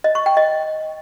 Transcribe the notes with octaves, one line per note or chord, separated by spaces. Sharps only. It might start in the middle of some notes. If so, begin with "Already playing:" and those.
D#5
C#6
G5
D#5